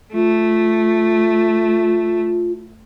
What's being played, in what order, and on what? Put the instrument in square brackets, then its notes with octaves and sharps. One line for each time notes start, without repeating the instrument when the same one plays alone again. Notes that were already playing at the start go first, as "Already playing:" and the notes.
[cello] A3 [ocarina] F4